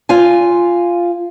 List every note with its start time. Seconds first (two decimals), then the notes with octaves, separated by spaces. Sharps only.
0.09 F4 F5 G#5